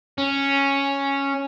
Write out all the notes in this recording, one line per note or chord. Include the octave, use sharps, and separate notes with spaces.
C#4